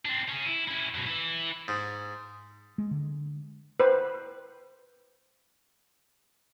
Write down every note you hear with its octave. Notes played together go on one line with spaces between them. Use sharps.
C4 D4
C#4 G#4
E4
C#4 E4
F#2 B2
E3 E4
G#2
G#3
D3
B4 C5